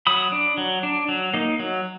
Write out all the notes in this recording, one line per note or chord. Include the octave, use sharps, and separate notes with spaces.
F#3 B5 D#6
D4
F#3
D4
F#3
A#3 D#4
F#3